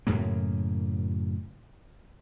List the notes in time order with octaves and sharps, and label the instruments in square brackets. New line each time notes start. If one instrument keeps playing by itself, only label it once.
[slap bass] F#2 A2 C#3 A#3